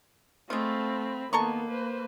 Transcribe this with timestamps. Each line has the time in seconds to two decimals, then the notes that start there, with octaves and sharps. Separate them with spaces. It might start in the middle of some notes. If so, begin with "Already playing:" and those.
0.50 G#3 A3 C4 F4 B5
1.33 D#3 A#3 B3 A4 A#5 C#6
1.71 B4 C5